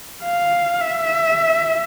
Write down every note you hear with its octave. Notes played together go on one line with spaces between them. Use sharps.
F5
E5